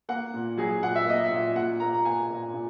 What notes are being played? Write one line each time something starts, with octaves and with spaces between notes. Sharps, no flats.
A#3 F#5
A#2
F#3 G#4
A#2 F#5
E5
A#3 D#5
E5
A#2
A#2 F#5
A#3 A#5
A#5
A#3 G#5
A#2
A#2